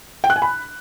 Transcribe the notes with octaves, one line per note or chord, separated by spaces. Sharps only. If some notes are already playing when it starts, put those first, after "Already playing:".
G5
F#6
G#5
B5